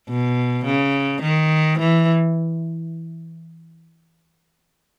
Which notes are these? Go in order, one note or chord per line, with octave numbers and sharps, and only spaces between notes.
B2
C#3
D#3
E3